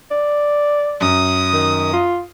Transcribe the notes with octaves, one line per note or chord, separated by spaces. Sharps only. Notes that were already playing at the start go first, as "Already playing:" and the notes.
D5
F#2 D#6
D#3
F4